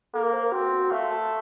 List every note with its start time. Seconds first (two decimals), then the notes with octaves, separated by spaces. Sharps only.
0.14 A#3 A4
0.23 A#4
0.33 C5
0.43 A#4
0.52 C4 F#4
0.72 F#4
0.91 A3 F5
1.11 A5